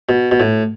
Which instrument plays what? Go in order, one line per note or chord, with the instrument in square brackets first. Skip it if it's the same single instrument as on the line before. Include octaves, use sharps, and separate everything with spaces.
[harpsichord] B2
B2
A2